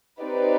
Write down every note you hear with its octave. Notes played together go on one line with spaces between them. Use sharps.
C4 D#4 G4 B4 D5